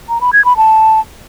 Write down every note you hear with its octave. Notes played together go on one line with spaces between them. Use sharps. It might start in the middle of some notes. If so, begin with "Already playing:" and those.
A#5
B5
G#6
B5
A5